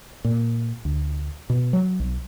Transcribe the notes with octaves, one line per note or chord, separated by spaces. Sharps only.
A#2
D2
B2
F#3
B1